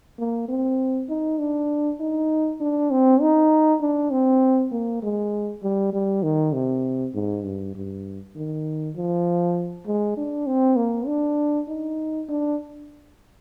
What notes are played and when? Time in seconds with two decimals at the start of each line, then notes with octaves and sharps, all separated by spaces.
0.19 A#3
0.49 C4
1.09 D#4
1.39 D4
2.00 D#4
2.61 D4
2.91 C4
3.21 D#4
3.81 D4
4.11 C4
4.72 A#3
5.03 G#3
5.63 G3
5.93 G3
6.23 D#3
6.53 C3
7.15 G#2
7.45 G2
7.75 G2
8.36 D#3
8.96 F3
9.86 G#3
10.17 D4
10.47 C4
10.76 A#3
11.07 D4
11.68 D#4
12.29 D4